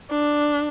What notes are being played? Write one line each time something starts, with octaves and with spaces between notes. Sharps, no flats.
D4